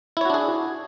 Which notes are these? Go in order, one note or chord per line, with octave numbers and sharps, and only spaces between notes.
D4 E4 F#4 G#4 C#5